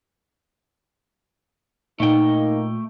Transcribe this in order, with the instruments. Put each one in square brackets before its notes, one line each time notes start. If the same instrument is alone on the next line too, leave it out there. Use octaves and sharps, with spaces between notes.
[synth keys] A#2 [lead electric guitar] A3 G5 [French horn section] A#3 D#4